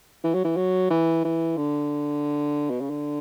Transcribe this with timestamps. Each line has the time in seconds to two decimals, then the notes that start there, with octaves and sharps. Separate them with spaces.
0.24 E3
0.34 F#3
0.44 E3
0.57 F#3
0.90 E3
1.24 E3
1.57 D3
2.70 B2
2.80 C#3
2.90 D3